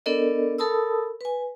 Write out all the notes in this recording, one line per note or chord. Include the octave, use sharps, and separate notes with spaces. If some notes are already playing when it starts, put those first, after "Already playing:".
B3 D4 A4 A#4 D5 D#5
A4 A#4 A5 B5 D#6 E6
B4 G#5